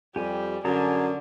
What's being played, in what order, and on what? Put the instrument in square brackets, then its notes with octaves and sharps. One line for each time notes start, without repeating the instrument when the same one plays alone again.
[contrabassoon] F2 [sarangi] G3 [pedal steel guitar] G4 G#5
[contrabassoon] F#2 [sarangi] D3 [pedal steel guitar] G#4 A5 A#5